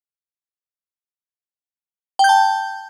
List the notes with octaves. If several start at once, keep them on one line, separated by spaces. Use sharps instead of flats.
G5 A5 G6